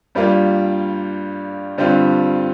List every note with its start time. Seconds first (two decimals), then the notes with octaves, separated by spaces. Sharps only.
0.15 G2 G3 A#3 F4
1.78 G2 D3 G3 C4 F4